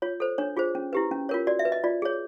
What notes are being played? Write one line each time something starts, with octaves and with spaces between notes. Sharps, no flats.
F4 C#5
A4 C5
D4 C#5
F4 G#4 C5
C#4
E4 G4 B4
C#4
F4 A#4 C#5
F#4 D5
E5
B4
D#5
F4 D5
G#4 C#5